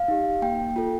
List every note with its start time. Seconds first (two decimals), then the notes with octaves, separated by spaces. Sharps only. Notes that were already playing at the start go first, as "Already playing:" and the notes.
Already playing: F5
0.08 D#4 G4
0.42 A#3 G5
0.76 F4 A4